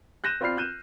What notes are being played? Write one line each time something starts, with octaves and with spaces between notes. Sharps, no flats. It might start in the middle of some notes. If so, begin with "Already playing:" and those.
F#6 G6 A#6 D#7 E7
C4 F4 D5 B5 F6 C7
F#6 G6 D#7 E7